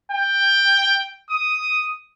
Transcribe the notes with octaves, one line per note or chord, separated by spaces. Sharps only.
G5
D#6